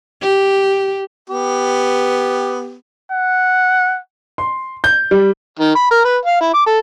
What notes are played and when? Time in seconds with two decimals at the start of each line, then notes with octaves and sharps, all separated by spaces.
0.22 G4
1.30 B3 G4
3.12 F#5
4.38 C6
4.84 G6
5.11 G3
5.59 D#3
5.76 B5
5.91 A#4
6.05 B4
6.26 F5
6.41 E4
6.54 D6
6.66 A4